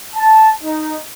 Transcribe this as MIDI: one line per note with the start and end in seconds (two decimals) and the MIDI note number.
0.15 0.50 81
0.63 0.95 63